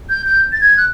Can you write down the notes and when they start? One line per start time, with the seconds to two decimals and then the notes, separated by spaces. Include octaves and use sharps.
0.09 G6
0.26 G6
0.52 A6
0.61 G#6
0.77 F#6